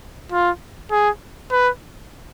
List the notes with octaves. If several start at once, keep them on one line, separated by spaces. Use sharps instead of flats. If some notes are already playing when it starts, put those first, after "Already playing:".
F4
G#4
B4